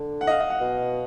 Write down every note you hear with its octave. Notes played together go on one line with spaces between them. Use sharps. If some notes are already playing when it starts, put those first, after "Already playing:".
Already playing: D3
F#5
D#5
F5
D#5
F#5
B2